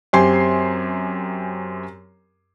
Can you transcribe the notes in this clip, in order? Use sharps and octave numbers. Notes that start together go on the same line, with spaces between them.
F#2 C4 G4 G#5 C6 C7